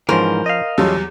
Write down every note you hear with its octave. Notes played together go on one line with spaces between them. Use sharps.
G#2 E3 F3 C#4 A#4 C5
D#5 F5
E2 F#3 G3 C#4 F4 A4